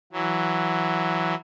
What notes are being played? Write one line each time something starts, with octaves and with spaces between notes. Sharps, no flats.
E3 F#3